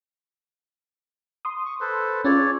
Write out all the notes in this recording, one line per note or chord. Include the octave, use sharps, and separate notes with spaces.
C6 D#6
C#6
A4 B4 C5
C#4 F4 G#4 C#5 D5